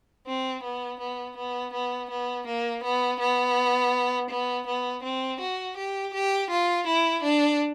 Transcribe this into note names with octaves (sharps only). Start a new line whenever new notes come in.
C4
B3
B3
B3
B3
B3
A#3
B3
B3
B3
B3
C4
F#4
G4
G4
F4
E4
D4